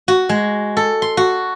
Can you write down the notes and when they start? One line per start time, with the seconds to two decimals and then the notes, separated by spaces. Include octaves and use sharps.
0.08 F#4
0.29 G#3
0.77 A4
1.02 C6
1.17 F#4